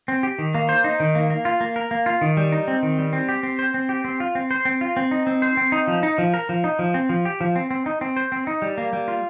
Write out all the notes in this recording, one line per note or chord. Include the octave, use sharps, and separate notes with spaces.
C4
G4
D#3
A#3
C5
D#4
D#3
A#3
A#3
F4
A#3
A#4
A#3
F4
D#3
G3
D#4
C4
D#3
G3
C4
G4
C4
C5
C4
G4
C4
F4
C4
C5
C4
F4
C4
D#4
C4
C5
C4
D#4
F3
D#4
F3
A#4
F3
D#4
F3
C4
F3
G4
F3
C4
C4
D#4
C4
C5
C4
D#4
G3
A#3
G3
F4